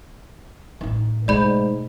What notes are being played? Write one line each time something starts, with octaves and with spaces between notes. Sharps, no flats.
A1 D#4
G#2 B2 A3 D5 B5 G6